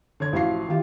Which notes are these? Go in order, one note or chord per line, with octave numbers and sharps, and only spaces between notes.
D3 C#5 G#6
A1 F3 E4 F#4 F5 C7
D#3 E3 F4 G4